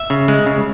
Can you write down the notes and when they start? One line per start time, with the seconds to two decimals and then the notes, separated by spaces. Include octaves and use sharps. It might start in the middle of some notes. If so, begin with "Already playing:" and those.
Already playing: E5
0.10 C#3
0.28 G#3
0.46 C#3